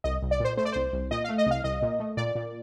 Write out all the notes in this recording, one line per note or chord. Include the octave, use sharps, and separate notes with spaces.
C2 D#5
C2
D5
A#2 C5
A3 C5
D5
C2 C5
C2
A#2 D#5
A3 F5
D#5
C2 F5
C2 D#5
A#2
A3
A#2 D5
A#2